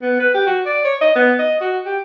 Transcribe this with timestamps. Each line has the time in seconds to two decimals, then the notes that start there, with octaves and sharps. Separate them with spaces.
0.02 B3
0.20 B4
0.34 G4
0.47 F#4
0.66 D5
0.85 C#5
1.01 D#5
1.16 B3
1.39 D#5
1.61 F#4
1.85 G4